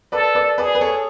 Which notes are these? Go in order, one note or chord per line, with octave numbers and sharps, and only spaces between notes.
A4 B4 D5
B4 D5
G#4 B4 D5
B4
A4 C#5